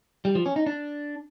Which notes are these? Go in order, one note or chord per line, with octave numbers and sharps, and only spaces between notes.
G3
F3
C#4
D#4
D4